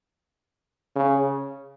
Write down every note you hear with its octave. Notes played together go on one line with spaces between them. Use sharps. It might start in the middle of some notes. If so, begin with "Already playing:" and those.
C#3